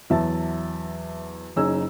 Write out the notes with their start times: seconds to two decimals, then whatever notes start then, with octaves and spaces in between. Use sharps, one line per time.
0.10 E2 F#3 E5 A5
1.56 F#1 C#4 D#4 G#4 E6